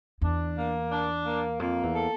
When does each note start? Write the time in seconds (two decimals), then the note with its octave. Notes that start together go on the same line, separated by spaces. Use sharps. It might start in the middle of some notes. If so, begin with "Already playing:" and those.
0.21 E2 D4
0.56 A#3
0.91 D4
1.26 A#3
1.60 F2 A#3
1.83 E2
1.95 A4